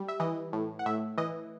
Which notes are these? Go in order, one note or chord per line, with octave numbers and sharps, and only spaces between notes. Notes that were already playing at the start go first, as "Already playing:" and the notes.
Already playing: G3
E5
E3 D#5
A2
F#5
A2 E5
E3 D#5